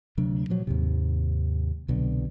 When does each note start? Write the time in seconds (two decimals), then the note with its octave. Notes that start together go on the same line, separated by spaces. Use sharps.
0.17 D2 C3 F#3 D4
0.50 A#2 F3 F#3
0.67 D#2 G#2 C3
1.88 C2 B2 D3 F#3